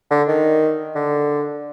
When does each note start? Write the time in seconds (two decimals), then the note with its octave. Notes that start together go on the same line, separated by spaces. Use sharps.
0.10 D3
0.27 D#3
0.95 D3